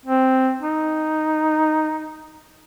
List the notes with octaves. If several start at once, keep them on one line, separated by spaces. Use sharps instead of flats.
C4
D#4